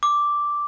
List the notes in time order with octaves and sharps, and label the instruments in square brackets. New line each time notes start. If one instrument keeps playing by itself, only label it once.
[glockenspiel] D6